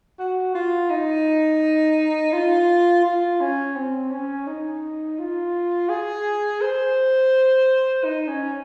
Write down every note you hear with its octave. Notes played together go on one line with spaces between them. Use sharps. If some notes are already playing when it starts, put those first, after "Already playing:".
F#4
F4
D#4
F4
F4
C#4
C4
C#4
D#4
F4
G#4
C5
D#4
C#4